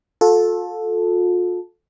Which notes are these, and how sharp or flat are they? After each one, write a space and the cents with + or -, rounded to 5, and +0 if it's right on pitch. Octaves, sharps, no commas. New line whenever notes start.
F4 +40 A4 -5